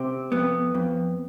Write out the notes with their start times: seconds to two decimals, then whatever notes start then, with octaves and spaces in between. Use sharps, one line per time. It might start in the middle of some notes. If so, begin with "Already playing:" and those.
Already playing: C3 C4
0.32 F2 B3
0.75 F2